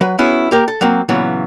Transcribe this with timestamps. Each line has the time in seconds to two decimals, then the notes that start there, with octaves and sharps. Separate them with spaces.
0.01 F#3 B4
0.19 B3 C#4 E4 F#4 G#4
0.51 A#3 G4 A#4
0.68 A4
0.81 F#3 A#3 C4
1.09 A#2 C#3 E3 F#3 B3